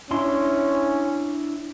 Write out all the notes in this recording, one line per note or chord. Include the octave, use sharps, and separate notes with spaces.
C#4 D4 E4 C6